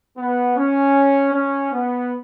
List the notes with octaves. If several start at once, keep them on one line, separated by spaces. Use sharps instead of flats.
B3
C#4
C#4
B3